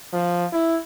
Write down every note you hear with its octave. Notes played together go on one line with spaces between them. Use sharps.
F3
E4